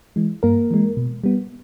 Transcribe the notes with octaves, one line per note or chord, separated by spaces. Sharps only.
E3 G#3
G2 A#3 A#4
E3 G#3
B2
G3 B3